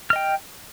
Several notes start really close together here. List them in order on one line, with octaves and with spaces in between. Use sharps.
F6 D#5 G5